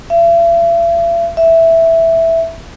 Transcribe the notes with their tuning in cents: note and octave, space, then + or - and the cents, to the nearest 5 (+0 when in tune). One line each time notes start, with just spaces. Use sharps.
E5 +45
E5 +0